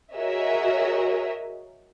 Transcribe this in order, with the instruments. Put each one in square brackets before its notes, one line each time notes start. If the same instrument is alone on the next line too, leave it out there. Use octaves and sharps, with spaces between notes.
[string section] F#4 G#4 A#4 C#5 D#5 E5